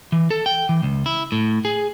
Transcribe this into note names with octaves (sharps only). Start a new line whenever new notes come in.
E3
A4
G5
E3
C#2
E4
A2
G#4